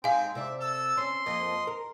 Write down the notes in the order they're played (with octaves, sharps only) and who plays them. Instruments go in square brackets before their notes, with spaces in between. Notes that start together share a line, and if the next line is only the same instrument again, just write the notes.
[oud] G#3 D#4 G4 [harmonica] C4 [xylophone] F5 G#5
[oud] C3 C5 D5 [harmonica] E5
[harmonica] A4 E6
[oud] C#4 [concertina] C6
[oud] F2 F3 A#3 [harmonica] D#5
[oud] A#4